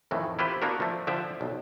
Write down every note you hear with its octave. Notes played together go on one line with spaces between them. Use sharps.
F2 A2 D#3 E3
E4 F4 G4 B4 C5
A#3 B3 D4 F#4 A#4
F3 A3
D3 F3 F4 E5 G5
B1